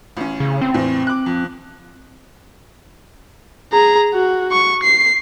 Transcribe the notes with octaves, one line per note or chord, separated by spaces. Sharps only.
A1 C#4
C#3
C4
E2 A2
D6 F#6
F2
G#4 A#5
F#4
C#6
C7